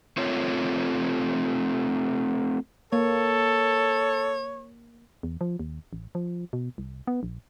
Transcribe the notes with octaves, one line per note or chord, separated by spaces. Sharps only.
A3 C4 F4 C#5
A#3 A4 C#5
E2
F3
D#2
A1
F3
B2
C2
B3
A#1